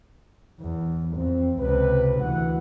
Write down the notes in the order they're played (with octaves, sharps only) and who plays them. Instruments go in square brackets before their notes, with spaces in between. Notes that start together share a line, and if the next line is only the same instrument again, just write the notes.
[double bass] E2
[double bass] F2 [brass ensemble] C4
[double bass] C#2 C3 [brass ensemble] B4
[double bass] D2 E3 [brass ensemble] F#5